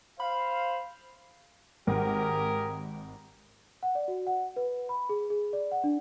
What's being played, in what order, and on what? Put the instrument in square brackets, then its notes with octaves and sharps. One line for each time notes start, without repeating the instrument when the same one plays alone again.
[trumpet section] C5 F5 [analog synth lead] B5
[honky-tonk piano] G#1 [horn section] G4 G#4 A#4
[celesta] F#5
D5
F#4
F#5
B4
B5
G#4
G#4
D5
F#5
D4